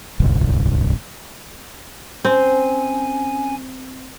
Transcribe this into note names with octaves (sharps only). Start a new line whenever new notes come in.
D1 G1 C2
C4 C#4 G#5